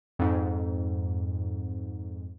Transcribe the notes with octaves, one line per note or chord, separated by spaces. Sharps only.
F2 G#2